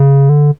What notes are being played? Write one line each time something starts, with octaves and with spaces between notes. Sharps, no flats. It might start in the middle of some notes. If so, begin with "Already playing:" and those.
Already playing: C#3
D3